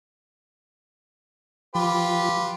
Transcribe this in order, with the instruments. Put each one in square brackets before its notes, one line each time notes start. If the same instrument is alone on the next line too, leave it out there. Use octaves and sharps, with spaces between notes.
[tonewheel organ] F3 [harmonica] F4 G4 B4